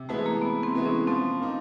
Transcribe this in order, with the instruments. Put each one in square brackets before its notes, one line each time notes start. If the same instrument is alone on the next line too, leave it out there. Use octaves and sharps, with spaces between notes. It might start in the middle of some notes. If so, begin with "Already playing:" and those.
Already playing: [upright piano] C3
[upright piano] E3 G#3 B3 E4 [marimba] A3
[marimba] A#3
[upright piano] C3 [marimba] B3
[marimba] C4
[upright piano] E3 G#3 B3 E4
[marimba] C#4
[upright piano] F3 [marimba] C4
[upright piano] A#3 D#4